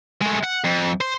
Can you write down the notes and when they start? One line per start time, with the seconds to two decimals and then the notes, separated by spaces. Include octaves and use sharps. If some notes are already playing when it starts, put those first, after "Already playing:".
0.21 G#3 A3
0.43 F#5
0.64 F2
1.01 C5